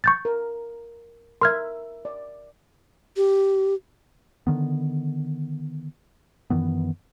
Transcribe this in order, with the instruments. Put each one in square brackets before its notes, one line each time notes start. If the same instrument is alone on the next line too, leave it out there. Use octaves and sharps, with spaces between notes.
[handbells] C#6 G6 A6
[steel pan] A#4
[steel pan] A#4 E5 [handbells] C6 F6 G#6
[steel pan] D5
[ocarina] G4
[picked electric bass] D3 D#3 B3
F#2 D#3 E3 B3